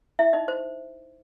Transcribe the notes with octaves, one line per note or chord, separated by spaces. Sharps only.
E4 E5
D#4 D#5
C5